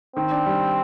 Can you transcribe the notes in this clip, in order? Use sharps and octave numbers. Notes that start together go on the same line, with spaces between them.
D#3 C4
D4
G3